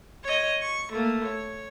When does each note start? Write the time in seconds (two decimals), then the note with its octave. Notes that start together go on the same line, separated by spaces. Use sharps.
0.24 C#5 D#5
0.62 C#6
0.93 A3 A#3
1.25 C#5